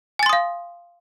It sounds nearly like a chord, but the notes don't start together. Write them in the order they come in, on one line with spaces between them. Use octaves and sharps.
G#5 A6 C6 D#6 F5